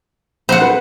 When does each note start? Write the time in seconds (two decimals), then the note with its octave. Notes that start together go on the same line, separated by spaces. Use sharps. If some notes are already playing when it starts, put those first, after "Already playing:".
0.49 C5 F#5
0.61 B4